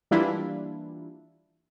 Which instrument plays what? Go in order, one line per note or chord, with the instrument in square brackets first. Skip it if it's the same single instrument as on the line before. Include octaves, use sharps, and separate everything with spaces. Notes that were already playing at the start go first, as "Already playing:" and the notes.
[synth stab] E3 G3 A#3 D4 E4 F4